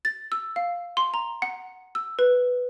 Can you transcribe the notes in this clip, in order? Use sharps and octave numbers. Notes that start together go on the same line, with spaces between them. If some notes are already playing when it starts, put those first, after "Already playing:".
A6
E6
F5
C6
A#5
F#5
E6
B4